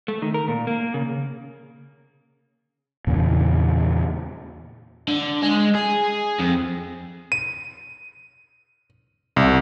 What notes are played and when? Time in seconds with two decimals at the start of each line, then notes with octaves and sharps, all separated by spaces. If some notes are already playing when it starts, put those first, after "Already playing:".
0.08 A3
0.22 D#3
0.34 A#4
0.48 A#2
0.67 A#3
0.94 C#3
3.07 E2 A#2 C#3
5.08 D3
5.42 G#3
5.75 G#4
6.39 F2
7.32 D#7
9.36 C2